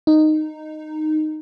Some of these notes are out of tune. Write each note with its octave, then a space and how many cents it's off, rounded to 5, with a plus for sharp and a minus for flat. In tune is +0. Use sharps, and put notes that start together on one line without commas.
D#4 -10